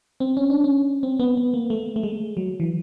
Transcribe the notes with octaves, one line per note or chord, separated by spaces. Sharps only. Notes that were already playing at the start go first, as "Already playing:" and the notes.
C4
C#4
D4
C#4
C4
B3
B3
A#3
A3
A3
G#3
F#3
E3